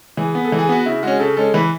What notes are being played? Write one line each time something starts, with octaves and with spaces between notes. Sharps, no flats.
E3 G#4
B3
A4
E3
G#4
B3 F#4
C#3 E4
G#3 C#4 F#4
C#3 A4
G#3 C#4 A4
E3 B4